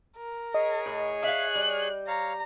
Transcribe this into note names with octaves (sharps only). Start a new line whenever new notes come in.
A#4
G#4 C#5 D#5 G#5
A2
E5 F5 F#6
G3
C#5 F5 A#5